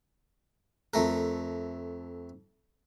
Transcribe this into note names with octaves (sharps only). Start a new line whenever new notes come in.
F2 A3 A#4